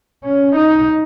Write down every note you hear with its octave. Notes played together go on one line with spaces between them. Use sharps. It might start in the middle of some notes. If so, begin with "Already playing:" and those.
C#4
D#4